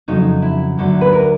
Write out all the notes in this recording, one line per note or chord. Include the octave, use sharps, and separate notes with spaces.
F2 C#3 F#3 D#4
E4
D2 D3 F#3
B4
A#4